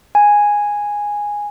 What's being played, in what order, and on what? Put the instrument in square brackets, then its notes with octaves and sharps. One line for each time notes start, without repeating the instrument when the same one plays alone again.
[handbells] G#5